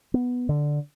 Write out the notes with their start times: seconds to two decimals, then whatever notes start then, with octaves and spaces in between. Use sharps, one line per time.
0.14 B3
0.49 D3